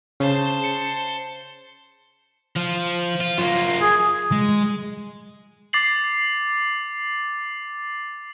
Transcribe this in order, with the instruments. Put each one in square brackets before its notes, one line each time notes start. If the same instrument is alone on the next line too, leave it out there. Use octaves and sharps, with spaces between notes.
[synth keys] C#3 [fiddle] C5 A5
[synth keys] C#7
[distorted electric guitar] F3
F4
[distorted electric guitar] F#2 A#3 [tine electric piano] F4
[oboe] G#4
[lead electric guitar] G#3
[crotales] D6 A6 C7 F#7